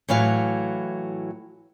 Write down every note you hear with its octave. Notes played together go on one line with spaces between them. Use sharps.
A2 E3 F#3 F5